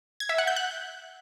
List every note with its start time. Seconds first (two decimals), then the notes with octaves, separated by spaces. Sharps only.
0.20 G#6
0.29 E5
0.38 F#5
0.47 G6
0.56 F#6